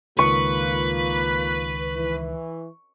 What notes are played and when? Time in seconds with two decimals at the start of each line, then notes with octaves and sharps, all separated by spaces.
0.19 C#2 D#3 A#3 F4 B4 C#6
1.96 E3